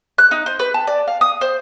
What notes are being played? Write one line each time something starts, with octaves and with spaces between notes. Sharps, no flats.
F#6
D#4
C5
B4
A5
D5
F5
D#6
C5